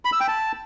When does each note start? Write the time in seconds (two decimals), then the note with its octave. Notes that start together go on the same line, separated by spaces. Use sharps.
0.05 B5
0.13 E6
0.20 G5
0.28 A5